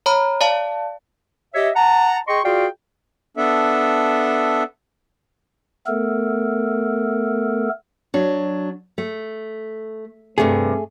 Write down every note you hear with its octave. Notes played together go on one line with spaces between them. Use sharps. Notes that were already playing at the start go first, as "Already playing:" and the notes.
C#5 A#5 B5
D5 F5 A5
G4 C#5 D#5 E5
F#5 A5 A#5
G#4 D#5 G5 C6 C#6
F4 F#4 G#4 D5 F5 G5
B3 D4 A4 E5
A3 B3 A4 A#4
F#3 D4
A3
G2 C3 A3 G#4